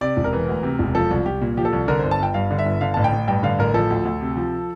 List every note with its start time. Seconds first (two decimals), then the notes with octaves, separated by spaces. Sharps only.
0.01 C3 D5
0.17 E1
0.24 A#4
0.33 E3
0.48 D2
0.63 C3
0.79 E1
0.95 F3 A4
1.11 C2
1.26 C2 G4
1.41 A#2
1.57 F3 G4
1.65 A4
1.73 C2
1.88 D3 A#4
1.99 G1 C5
2.11 A5
2.20 G1 G5
2.34 G2 F5
2.51 D3
2.59 E5
2.66 G1
2.81 D3 F5
2.94 A1 A5
3.04 G5
3.12 A1
3.27 G2 G5
3.43 D3 F5
3.59 A1 A#4
3.74 F3 A4
3.90 D2
4.05 D2
4.21 C3
4.37 F3